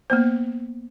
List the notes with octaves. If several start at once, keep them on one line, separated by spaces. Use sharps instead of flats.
A#3 B3 C5